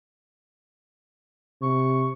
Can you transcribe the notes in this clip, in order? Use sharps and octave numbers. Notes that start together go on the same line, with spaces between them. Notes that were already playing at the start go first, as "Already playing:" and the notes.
C3 C#6